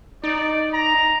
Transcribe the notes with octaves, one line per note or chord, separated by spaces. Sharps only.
D#4 D5
A#5